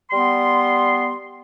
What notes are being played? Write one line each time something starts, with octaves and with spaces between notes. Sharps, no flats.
G3 B3 C6